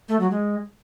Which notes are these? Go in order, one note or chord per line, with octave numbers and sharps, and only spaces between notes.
A3
F#3
G#3